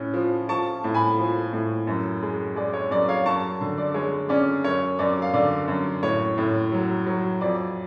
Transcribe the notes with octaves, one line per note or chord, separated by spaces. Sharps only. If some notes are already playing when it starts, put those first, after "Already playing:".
Already playing: A2 C#4
F3
F3 A5 C#6
A2
G#5 B5
F3
A2
F#2
G#3
G#3 D5
C#5
F#2 D5
C#5 F5
F#2 A5 C#6
D3
D5
G#3 C#5
C#4 D5
F#2 C#5
F#2 D5
F5
D3 D5
F#2
A2 C#5
A2
F#3
F#3
F2 D5